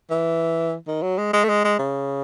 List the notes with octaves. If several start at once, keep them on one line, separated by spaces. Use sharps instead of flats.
E3
D#3
F#3
G#3
G#3
A3
G#3
G#3
C#3